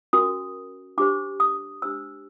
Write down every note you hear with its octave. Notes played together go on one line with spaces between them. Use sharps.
C#4 F#4 A#4 D#6
D4 G4 C5 D6
D#6
D4 G4 C5 E6